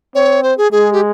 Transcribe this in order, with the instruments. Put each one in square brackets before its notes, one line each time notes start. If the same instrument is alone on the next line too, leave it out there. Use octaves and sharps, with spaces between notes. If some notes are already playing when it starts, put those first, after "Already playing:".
[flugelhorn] C4 [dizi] C#5
[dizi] C5
G#4
[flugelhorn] G#3 [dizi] G#4
[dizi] G4